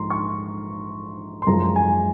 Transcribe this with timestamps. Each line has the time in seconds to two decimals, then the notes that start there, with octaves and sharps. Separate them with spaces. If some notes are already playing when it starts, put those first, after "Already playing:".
Already playing: A#1 G#2 A#5 C6
0.10 C#6
1.42 C6
1.47 F#2 F3 G#3 A#5
1.76 G#5